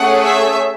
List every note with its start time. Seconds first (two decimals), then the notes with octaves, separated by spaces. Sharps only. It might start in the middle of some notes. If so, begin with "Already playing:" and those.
Already playing: A3 C#4 G#4 F#5
0.23 E5